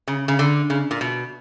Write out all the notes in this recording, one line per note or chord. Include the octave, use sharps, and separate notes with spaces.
C#3
C#3
D3
C#3
A#2
B2